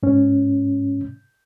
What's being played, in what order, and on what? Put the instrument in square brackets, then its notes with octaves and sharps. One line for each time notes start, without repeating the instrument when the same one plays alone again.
[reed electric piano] G#2 C#4